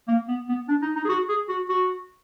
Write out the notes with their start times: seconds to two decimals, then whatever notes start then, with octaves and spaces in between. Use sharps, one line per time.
0.08 A#3
0.29 B3
0.49 B3
0.69 D4
0.82 D#4
0.96 D#4
1.05 G#4
1.09 F#4
1.29 G#4
1.49 F#4
1.69 F#4